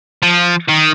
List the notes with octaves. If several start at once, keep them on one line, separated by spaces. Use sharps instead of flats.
F3
D#3